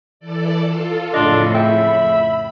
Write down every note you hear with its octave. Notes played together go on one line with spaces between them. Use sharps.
E3 A4 D5
F4 A4
F2 A2 C#3 D4 D#5 C6
E5 G5 B5